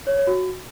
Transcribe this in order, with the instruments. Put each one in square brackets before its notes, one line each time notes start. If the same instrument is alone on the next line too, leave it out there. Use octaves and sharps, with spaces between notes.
[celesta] C#5
C#5
F#4